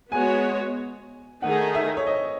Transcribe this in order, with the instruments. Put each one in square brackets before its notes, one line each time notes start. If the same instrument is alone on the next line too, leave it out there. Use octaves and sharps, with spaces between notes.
[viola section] G#3 B3 F#4 C#5 [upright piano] G#5
[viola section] D#3 A3 D#4 G#4 [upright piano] F#5
[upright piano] E5
C#5
D#5